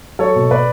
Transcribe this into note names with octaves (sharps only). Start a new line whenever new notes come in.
F#3 A4 C#5
B2
B2 B4 D5